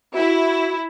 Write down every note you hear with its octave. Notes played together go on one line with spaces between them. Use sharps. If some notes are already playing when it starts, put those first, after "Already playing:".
E4 F#4